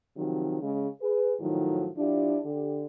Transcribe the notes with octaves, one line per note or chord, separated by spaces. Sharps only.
C3 D#3 F3 F#3
C#3 G#3
G#4 B4
A2 D#3 F3 F#3
F3 D4 E4 G4
D3 G4